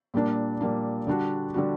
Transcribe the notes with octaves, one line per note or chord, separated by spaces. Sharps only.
A#2 G3 A#3 D4
A#2 G3 A#3 D4
D3 G3 D4 F#4
D3 G3 D4 F#4